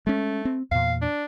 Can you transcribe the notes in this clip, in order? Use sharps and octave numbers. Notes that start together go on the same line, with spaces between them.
G#3 A3 C#4
C4
E2 A#2 F5
D4